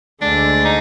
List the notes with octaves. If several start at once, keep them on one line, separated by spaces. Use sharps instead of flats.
D2 D3 G#3 D4
D#4